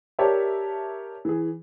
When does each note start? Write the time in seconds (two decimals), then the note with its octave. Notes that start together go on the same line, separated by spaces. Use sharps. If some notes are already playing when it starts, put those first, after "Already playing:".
0.19 G4 A#4 C#5 D5 E5 A5
1.25 E3 G#4